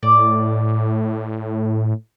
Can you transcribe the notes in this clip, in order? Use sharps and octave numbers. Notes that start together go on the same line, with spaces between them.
A2 D5